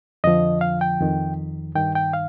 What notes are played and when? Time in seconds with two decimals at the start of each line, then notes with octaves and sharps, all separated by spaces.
0.24 F2 D3 F3 D#5
0.61 F5
0.81 G5
1.00 F2 D#3
1.75 G2 D#3 G5
1.95 G5
2.13 F5